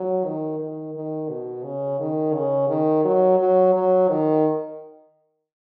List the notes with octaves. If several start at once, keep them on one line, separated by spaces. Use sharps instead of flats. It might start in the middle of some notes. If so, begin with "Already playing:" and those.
Already playing: F#3
D#3
D#3
D#3
B2
C#3
D#3
C#3
D#3
F#3
F#3
F#3
D#3